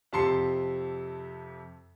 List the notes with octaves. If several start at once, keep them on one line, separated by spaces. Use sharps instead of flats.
F2 C3 A5 C6 C7 C#7